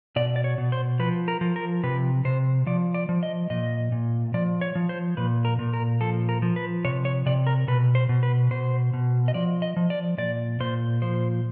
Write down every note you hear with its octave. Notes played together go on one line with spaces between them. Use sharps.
B2 D5
D5
C#5
B2
C5
F3 B4
A#4
F3
A#4
C3 B4
C3 C5
F3 D5
D5
F3
D#5
A#2 D#5
A#2
F3 D5
C#5
F3
C5
A#2 B4
A#4
A#2
A#4
F3 A4
A#4
F3
B4
C3 C#5
C#5
C3 D5
A#4
B2 B4
C5
B2
B4
B2 C5
B2
D#5
F3 D5
D#5
F3
D5
A#2 D5
A#2 C5
F3 C5